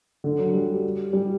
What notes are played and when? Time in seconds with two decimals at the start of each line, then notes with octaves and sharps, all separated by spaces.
0.24 D3
0.39 F#3
0.54 G3
1.13 G3